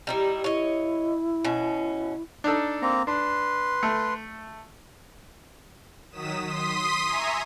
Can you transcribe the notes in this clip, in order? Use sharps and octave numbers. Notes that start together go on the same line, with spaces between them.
G3 D#4 E4
E4 C#5 D#5
B2 C#4
D4 D#4 A4
A#3 C4 A#5
D4 B4 C6
A3
D#3 F#3 D#6 B6 E7
C6 D#6 B6 D#7
E5 G#5 A#5 C#6